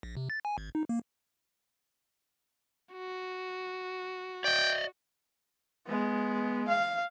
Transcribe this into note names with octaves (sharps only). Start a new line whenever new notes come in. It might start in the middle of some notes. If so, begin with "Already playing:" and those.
A#1
C3
A6
G#5
G#1
D#4
A#3
F#4
D5 D#5 G5
G#3 B3
F5